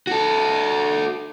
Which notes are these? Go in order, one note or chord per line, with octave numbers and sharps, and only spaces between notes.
F#4 A4